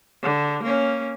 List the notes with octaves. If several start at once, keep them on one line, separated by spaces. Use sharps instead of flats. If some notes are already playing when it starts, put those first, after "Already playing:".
D3
A#3 C#4